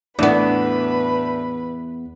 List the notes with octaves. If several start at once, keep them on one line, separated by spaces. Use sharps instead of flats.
E2 A2 B3 D4 B4 B5